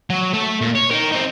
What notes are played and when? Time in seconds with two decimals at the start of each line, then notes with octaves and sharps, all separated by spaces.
0.10 F#3
0.33 A3
0.61 A#2
0.75 C#5
0.91 D#4 A#4
1.12 C4 D#4